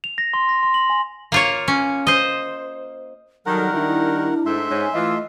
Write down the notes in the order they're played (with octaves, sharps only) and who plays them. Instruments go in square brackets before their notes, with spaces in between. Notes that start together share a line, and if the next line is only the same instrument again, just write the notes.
[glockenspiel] F7
A#6
C6
A#6
C6
F#7
G#5
[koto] A#3 F4 C#5
C#4
C5 D#5
[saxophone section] D#3 G3 [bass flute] F#3 [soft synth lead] A4 [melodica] A#4 F#5
[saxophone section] D#3 G3 [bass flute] D4 [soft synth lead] E4
[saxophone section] G#2 A3 [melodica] E5 C6
[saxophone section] G#2 C#4 [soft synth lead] G#5
[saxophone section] E3 F4 [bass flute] A3 [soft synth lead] D#5